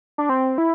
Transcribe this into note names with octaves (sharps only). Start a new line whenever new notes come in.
D4
C4
E4